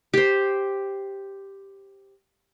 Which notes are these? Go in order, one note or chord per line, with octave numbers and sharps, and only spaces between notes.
G4 C5